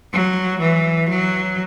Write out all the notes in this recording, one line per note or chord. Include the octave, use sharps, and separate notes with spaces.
F#3
E3
F#3